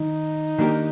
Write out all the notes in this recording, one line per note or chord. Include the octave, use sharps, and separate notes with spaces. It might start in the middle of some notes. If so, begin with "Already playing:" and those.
Already playing: D#3 D#4
D#3 A#3 D4 G4 A#4